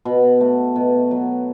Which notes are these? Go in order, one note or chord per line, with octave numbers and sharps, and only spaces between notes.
B2
A3
B2
F#3